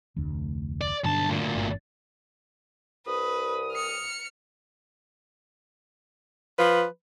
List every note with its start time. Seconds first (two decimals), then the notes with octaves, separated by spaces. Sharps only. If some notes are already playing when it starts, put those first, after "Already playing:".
0.16 F1 D2
0.81 D5
1.04 B1 G2 D3 A5
1.29 D2 A#2
1.55 G1
3.07 C2 B4 D#6
3.73 F6 C#7
6.58 F3 B4